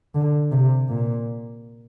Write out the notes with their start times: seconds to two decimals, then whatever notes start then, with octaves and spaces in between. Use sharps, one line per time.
0.15 D3
0.52 C3
0.89 A#2